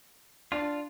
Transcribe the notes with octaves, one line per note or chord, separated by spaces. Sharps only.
D4 F4